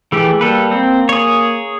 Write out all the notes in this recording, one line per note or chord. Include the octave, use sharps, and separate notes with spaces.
E3 A3 G4 G#4
G3 A#3 A4 B4
C4
G#4 C#5